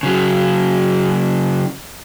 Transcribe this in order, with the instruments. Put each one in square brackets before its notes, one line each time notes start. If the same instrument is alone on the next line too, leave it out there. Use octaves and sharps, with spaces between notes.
[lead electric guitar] C#3 F#3